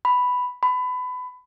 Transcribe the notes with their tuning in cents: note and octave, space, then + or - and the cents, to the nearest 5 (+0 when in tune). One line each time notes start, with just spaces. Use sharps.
B5 +5
B5 +25